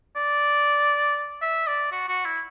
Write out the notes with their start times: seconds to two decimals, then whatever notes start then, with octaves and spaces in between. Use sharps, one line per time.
0.16 D5
1.42 E5
1.67 D5
1.92 F#4
2.09 F#4
2.25 E4